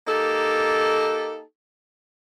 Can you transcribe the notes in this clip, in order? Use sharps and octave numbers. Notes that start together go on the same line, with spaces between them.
A#3 D#4 G4 A4